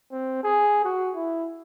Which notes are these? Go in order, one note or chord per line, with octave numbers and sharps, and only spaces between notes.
C4
G#4
F#4
E4